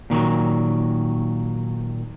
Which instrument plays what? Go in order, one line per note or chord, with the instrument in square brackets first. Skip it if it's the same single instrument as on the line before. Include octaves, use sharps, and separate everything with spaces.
[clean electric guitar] A#2 D#3 F3 F#3